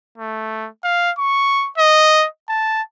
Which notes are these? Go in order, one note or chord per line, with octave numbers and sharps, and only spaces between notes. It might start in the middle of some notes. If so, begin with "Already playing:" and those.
A3
F5
C#6
D#5
A5